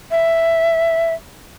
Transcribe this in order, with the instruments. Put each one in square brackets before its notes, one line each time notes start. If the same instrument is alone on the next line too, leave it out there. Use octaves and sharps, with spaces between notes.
[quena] E5